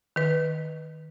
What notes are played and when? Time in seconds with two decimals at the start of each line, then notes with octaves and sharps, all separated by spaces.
0.16 D#3 B4